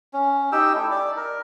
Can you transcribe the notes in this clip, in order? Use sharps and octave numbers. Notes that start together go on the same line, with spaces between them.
C#4
D#4 G4 G5 E6
A3 E4
D5
A#4